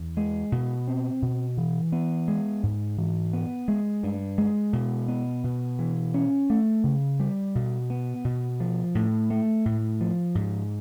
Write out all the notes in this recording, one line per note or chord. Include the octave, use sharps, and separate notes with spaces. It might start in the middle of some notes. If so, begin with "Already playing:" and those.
Already playing: E2
G#3
B2
C4
B2
E3
B3
G#3
G#2
E3
B3
G#3
G2
G#3
B2
B3
B2
E3
C#4
A3
C#3
G3
B2
B3
B2
F3
A2
A3
A2
F3
G#2